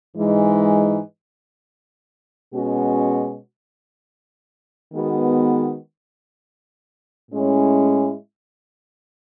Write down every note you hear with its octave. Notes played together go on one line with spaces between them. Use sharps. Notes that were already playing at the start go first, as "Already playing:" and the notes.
G#2 E3 G#3 D#4
B2 G#3 C#4 F#4
D#3 G#3 B3 F#4
A2 G#3 C#4 E4